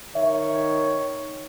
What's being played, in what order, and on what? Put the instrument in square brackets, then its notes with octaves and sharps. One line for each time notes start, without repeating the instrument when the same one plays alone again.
[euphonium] D#3 [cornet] C#5 [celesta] E5